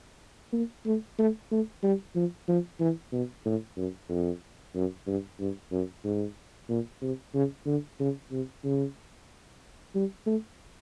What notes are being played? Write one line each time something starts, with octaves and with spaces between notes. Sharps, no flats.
A#3
A3
A3
A3
G3
F3
F3
E3
B2
A2
F#2
F2
F#2
G2
G2
F#2
G#2
A#2
C3
C#3
D3
C#3
C3
C#3
G3
A3